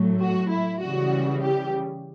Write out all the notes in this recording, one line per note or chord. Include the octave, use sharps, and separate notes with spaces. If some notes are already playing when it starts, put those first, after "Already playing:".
Already playing: A2 F#3 A3
F#4
E4
C#3 E3 G3 F#4
G4